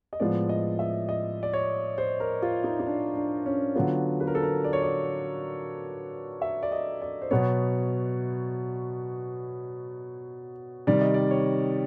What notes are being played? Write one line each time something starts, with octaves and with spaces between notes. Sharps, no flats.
D#5
A2 F3 G#3 B3 D5
D#5
E5
D#5
D5
C#5
C5
A#4
F4
D#4
D#4
D4
D4
C#4
D3 F#3 B3 F4
B4
A#4
A4
A#4
D5
C#5
D5
E5
D5
D#5
D5
C5
B2 F#3 B3 C#5
C3 D#3 G3 D5
D#5
D5
C#5